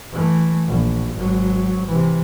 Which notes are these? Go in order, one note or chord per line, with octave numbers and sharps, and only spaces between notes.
E3 A3
A#1
G#1 F#3
C3 E3